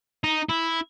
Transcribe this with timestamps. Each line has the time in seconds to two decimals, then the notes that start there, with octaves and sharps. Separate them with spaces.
0.24 D#4
0.49 E4